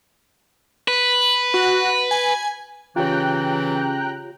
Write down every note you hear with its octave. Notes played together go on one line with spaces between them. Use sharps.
B4
F#4
G#5
C#3 E3 F4 G4 C#5 G5 A#5 F#6